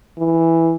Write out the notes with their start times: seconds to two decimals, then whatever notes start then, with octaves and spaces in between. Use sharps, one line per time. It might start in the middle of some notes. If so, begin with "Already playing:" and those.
0.19 E3